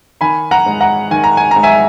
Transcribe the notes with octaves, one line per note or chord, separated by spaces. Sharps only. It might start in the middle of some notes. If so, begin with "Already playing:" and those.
D#3 G#5 B5
F#5 A#5
G#2
F#5 A#5
D#3 G#5
A#5
G#5
G#2 A#5
E5 G#5